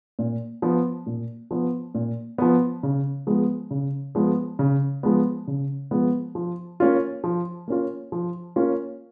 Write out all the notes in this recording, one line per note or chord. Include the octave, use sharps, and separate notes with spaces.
A#2
F3 B3
A#2
F3 B3
A#2
F3 B3
C#3
F3 G#3 B3
C#3
F3 G#3 B3
C#3
F3 G#3 B3
C#3
F3 G#3 B3
F3
A#3 C#4 F4
F3
A#3 C#4 F4
F3
A#3 C#4 F4